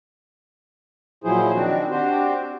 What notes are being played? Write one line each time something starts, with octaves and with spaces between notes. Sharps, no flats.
A#2 F3 F#3 E4 G#4 C5
D#3 C4 D4 F#4
C4 D4 F#4 G4 C5